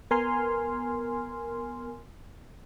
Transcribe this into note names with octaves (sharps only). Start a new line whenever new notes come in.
B3 A#4 G#5 C6 F6